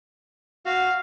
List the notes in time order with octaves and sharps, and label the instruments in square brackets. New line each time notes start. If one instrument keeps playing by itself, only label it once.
[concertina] F#4 [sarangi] F5